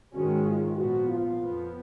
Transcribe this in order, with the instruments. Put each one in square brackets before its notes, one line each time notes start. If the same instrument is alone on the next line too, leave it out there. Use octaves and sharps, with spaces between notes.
[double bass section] G#2 D#3 G#3 C#4 [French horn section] F#4
[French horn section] F4
[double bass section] A#2 F3 B3 [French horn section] F#4
[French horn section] F4
[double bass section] F2 F3 B3